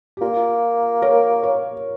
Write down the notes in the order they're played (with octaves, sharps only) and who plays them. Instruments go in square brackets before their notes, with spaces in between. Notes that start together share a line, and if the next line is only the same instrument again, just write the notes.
[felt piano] G4
[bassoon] A#3 [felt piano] F4
[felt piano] A#4 C#5
A#4 C#5